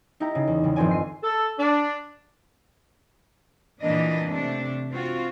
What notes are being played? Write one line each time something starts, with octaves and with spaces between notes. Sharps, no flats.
D#4 E4 G4 A#5
C#3
E2
C#3 G3
G1 D#3 F3 C4 D5 G#5
C7 D#7
A4
D4
A#2 D3 E3 A#3 D4 D#5
C3 A3 D4
C4 F4 F#4